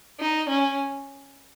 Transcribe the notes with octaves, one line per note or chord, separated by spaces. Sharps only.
D#4
C#4